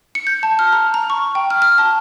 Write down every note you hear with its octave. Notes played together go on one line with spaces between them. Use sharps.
C#7
G6
A5
F6
A#5
A#5
C#6
G5
F6
F6
A5